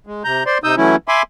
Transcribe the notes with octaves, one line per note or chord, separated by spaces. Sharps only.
G#3
C3 A#5 G6
C5 D5 C6
C3 D#4 D#6 E6 G6
E3 F#3 A3 C#4 E4
E5 G#5 B5 C6 D6